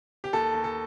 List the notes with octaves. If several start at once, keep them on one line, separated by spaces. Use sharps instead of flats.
G4
D#2 A4
D#2
A4